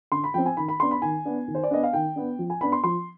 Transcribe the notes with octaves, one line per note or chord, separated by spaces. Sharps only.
D3 C6
B5
F3 C4 G5
G#5
D#3 B5
B5
B3 D4 C6
B5
D#3 G#5
B3 D4
D#3
C5
D5
B3 D4 D#5
F5
D#3 G5
B3 D4
F3
G#5
B3 D4 B5
C6
F3 C6